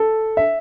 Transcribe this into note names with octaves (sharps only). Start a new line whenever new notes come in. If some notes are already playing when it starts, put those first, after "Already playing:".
Already playing: A4
E5